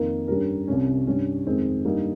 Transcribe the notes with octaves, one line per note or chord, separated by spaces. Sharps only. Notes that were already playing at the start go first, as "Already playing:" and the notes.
Already playing: F2 D#3 A#3 D#4 A#4
G2 G3 C#4 G4 A#4
C2 C3 G3 C#4
G2 G3 C#4
F2 D#3 G#3 C4
G2 G3 A#3 D#4